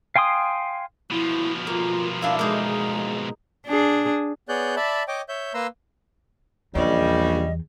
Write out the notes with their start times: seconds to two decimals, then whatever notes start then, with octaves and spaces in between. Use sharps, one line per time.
0.16 F5 G5 G#5 C6 D#6
1.11 B2 F3 E4
1.67 A#3 F4
2.22 D4 E4 F5
2.39 G#3 A#3 D#4 G#4
3.66 D4 G#4
4.49 B3 G#4 C#5 D5 F#6 G6
4.76 D5 E5 A5 B5
5.08 C#5 D#5 G5 D6
5.29 C#5 E5 G6
5.54 A#3 B4 A#5 C6 E6
6.75 A#1 E2 C#3 G3 D#5